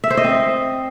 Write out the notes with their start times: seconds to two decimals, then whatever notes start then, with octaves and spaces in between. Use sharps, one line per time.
0.04 E5
0.10 C5
0.17 D#5
0.24 C4